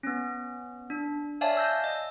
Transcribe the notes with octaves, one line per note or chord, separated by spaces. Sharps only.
B3 C#4
D4
C#5 D5 E5 F5 G#5 A5
E6 G6 A#6
D#5